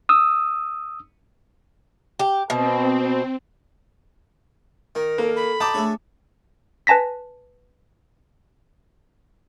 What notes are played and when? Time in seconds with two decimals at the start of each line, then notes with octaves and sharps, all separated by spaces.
0.09 D#6 E6
2.19 G4
2.50 B2 C4
4.95 D#3 A#4
5.18 A#3 A4
5.36 B5
5.60 D#5 G5 A5 A#5 D6
5.74 A3 D4 G#4 C#5 E5
6.87 B4 G#5 A5 A#6 B6